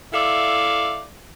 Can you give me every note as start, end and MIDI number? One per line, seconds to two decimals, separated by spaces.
0.13 1.04 64
0.13 1.04 69
0.13 1.04 74
0.13 1.04 76
0.13 1.04 77